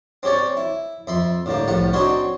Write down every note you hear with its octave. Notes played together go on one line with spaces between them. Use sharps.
C4 C#4 G4 C#5 D5
E4
F2 E5 B5 C6
A2 D3 G3 A#3
C2 A2 F3 G3 F#5
C4 D4 D#4 F#4 C5 C#5